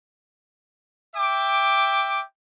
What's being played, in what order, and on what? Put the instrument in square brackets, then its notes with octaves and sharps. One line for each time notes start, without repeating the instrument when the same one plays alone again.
[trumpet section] E5 G5 D6